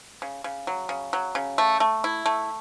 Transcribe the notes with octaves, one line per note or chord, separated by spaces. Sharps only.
C#3
C#3
F#3
C#3
F#3
C#3
A3
A3
E4
A3